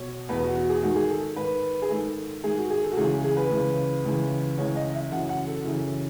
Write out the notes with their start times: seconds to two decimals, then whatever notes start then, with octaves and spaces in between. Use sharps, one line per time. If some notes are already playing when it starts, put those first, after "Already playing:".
Already playing: B2 C#5
0.29 E2 B2 B4
0.42 F#4
0.55 F#4
0.69 G#4
0.83 G#2 D#3 F#4
0.96 G#4
1.10 A4
1.36 G#2 D#3 B4
1.82 G#4
1.90 G#2 D#3 A4
2.43 G#2 D#3 G#4
2.57 F#4
2.70 G#4
2.83 A4
2.92 F#4
2.97 C#2 C#3 E3 G#4
3.24 G#4
3.37 B4
3.51 C#2 C#3 E3
4.05 C#2 C#3 E3
4.58 C#2 C#3 E3 C#5
4.76 D#5
4.93 E5
5.11 F#2 C#3 E3 F#5
5.29 F#5
5.47 A4
5.65 F#2 C#3 E3